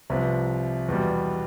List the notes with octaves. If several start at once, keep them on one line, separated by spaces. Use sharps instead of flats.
C2 C3 F3 B4
E2 B2 G3